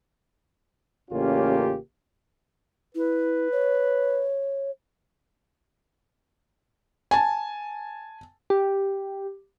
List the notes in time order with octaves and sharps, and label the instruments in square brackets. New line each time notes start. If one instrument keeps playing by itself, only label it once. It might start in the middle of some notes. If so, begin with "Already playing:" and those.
[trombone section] A1 C#3 A#3 C#4 F4 G4
[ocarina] E4 [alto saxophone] B4
[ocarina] C#5
[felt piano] G#5 A5
[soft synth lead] G4